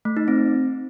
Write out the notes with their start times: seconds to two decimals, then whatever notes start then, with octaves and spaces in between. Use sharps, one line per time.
0.05 A3
0.17 D#4
0.28 C4